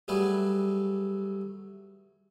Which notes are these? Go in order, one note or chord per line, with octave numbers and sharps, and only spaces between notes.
F#3 G3 A3 G#4 B4